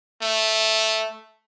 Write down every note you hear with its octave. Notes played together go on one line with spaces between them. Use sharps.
A3